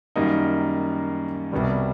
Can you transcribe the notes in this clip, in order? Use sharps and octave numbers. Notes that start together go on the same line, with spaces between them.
F#2 D#3 G3 A#3 D#4
C2 B2 G3